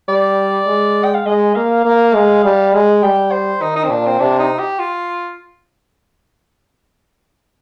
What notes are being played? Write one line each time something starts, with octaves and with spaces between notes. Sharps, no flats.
G3 D5
G#3
G5
F5
G#3 D#5
A#3 F5
A#3
G#3
G3
G#3
G3 G5
C5
D#3 D#4
D#4
C4
A#2 D4
C4
C3 D4
D#4
G4
F4